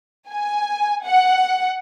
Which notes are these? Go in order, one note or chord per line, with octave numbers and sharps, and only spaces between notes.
G#5
F#5